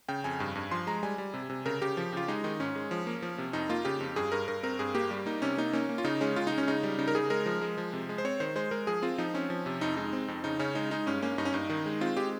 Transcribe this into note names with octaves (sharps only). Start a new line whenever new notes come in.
C#3 G5
F2 G#5
G2
G2
F3 C6
G#3 A#5
G3 G#5
G3
C3
C3
C#3 A#4
C#3 G4
F3
C#3 F4
G#3 D#4
D#3 D#4
G#2 C#4
G#3
F3
A#3
F3
C3
F2 D#4
A#3 F4
C#3 G4
F2
G2 G#4
G2 A#4
G2 A#4
C4 A#4
G2 G#4
A#3 G4
G3
A#3 D#4
C3 C#4
A#3 D#4
A#3 C#4
A#3
F4
C#3 D#4
G#3 C#4
C#3 F4
G#3 D#4
C#4
C#3 D#4
G3
C#3 D#4
A#4
C#3 G#4
G#3 A#4
F3
G#3
F3
C3
G#3
C5
C4 C#5
D#3 C5
G#3 C5
G#3 A#4
F3 G#4
C4 F4
F3 D#4
C4 C#4
F3
C3
F2 D#4
G#3 D#4
C4
F2
C#3 D#4
C#3 C#4
G#3 D#4
G#3 D#4
G2 C#4
A#3 C#4
G2 D#4
C#4
G2 D#4
D#3
G#3
C4 F4
G#3 G4